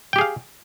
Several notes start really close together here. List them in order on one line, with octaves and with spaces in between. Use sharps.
G5 G4 G#4 F5